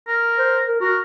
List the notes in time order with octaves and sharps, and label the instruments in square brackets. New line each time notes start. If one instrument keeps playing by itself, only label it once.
[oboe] A#4
[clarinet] C5
A#4
[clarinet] F#4 [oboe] A#4